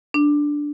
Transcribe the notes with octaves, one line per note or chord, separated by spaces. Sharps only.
D4